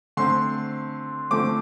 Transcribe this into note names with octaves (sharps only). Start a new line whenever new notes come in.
D3 A3 C4 C6
D3 F3 A3 C4 D6